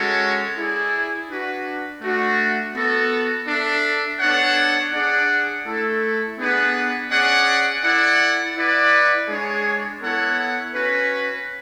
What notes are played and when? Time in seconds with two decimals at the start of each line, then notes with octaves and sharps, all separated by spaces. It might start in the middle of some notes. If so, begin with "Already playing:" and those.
Already playing: G#3 C#4 F#4 A4 C#5
0.55 E4 G#4 D5
1.28 D4 F#4 B4
2.01 A3 D4 F#4
2.74 B3 F#4 A4
3.46 D4 A4 E5
4.19 B3 D4 A4 C#5 F#5
4.92 D4 G#4 D5 F#5
5.65 A3 E4 A4
6.38 B3 D4 G#4 B4 F#5
7.10 C#4 G#4 D5 F#5
7.83 E4 A4 D5 F#5
8.56 E4 B4 D5 F#5
9.28 G#3 D4 G#4 C#5
10.01 B3 E4 A4 C#5 F#5
10.73 C#4 F#4 B4